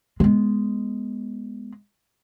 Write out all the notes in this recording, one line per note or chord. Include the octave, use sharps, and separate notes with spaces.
G#3 B3